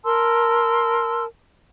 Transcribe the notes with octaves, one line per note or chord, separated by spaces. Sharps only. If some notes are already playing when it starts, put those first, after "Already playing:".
A#4 A5 C6 E6